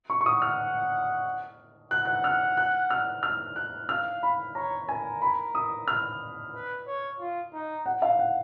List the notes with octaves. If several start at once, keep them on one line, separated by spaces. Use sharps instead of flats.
C#6
C#6
F#5 D#6
F6
F#5 F#6
F#6
F6
F#6
F6
F6
F#6
F5 F6
B5
C#5 A#5
A#4 G#5
B5
D#6
F6
B4
C#5
F4
D#4
F#5
F5
F#5